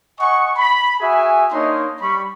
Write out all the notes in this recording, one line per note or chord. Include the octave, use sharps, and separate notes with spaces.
D#5 F#5 G#5 C#6
B5
F#4 G#4 E5 G#5
A#3 D4 D#4 C#5 D#5 C6
G3 B5 C#6